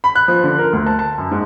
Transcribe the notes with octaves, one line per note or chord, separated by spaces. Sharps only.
B5
F#6
F3
D3
A#4
D2
A5
A5
F#2
G#2